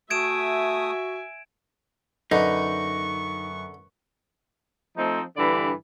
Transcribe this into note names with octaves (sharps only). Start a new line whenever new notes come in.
A3 F#4 E5 G#5 D#6 G#6 D7 E7
F#2 D3 D#4 B4 C#6
F3 A3 C4 D#4
G2 D3 E3 D5 B5